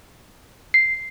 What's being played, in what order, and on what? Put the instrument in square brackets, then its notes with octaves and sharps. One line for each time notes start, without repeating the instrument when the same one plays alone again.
[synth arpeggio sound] C7